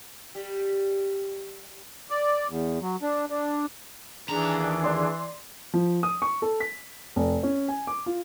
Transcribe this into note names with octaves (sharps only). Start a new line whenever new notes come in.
G3 G4
D5
E2
F#3
D4
D4
D#2 E3 D4 G#4 A#5
D5 C6
F3
D#6
C#6
A4
B6
F1
C#4
G#5
D6
F4